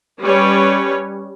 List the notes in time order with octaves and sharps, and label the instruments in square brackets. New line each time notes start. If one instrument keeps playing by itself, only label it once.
[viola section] G3 C#4 B4 C#5